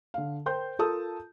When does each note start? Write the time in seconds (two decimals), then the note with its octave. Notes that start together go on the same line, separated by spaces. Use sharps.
0.14 D3 F5
0.46 A#4 C5 G5 C6 G6
0.79 F4 A4 A#4 A5 D#6 E6